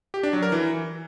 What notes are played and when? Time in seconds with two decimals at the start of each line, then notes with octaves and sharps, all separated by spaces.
0.14 G4
0.23 D4
0.33 F#3
0.43 A#4
0.52 E3